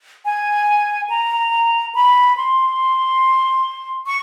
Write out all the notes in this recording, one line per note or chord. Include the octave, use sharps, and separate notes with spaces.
G#5
A#5
B5
C6
C#6